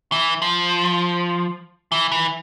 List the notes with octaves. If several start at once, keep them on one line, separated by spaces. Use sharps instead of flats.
E3
F3
E3
E3